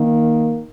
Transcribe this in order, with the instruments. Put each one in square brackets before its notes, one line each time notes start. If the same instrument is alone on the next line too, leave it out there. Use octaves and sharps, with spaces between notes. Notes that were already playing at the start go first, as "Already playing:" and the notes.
Already playing: [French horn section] D#3 A#3